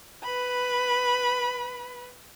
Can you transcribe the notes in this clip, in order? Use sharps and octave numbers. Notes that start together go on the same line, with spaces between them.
B4 B5